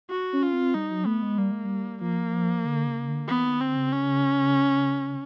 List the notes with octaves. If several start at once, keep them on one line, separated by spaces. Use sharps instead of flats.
F#4
C#4
F4
C4
G3 D#4
F#3
A3 B3
G#3
G3 A#3
G#3
G3
F3 A#3
D3
C#3
D3
E3 B3
D#3
D3 C4
C#3
C#4